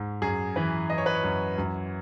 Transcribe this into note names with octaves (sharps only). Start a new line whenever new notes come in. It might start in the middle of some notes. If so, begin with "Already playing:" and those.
Already playing: G#2
F#2 G#4
E3 B4
E3 D#5
C#5
B4
C#5
F#2
F#2